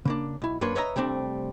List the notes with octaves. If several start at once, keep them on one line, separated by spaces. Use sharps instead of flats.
C#3 A#3 D4
B1 E4
F#2 A#3 D4 B4 C#5 C6
B4 C#5 D#5 E5 G5 A#5
C3 G3 A3 C4 D4